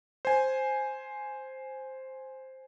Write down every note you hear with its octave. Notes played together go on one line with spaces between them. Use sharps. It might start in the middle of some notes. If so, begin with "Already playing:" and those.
C5 G#5